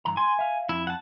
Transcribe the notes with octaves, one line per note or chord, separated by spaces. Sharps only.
G2 E3 A#5
G#5 C6
E5 F5
F2 E4
F#5 A5